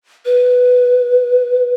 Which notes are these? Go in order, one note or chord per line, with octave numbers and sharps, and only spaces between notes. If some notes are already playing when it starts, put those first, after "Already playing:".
B4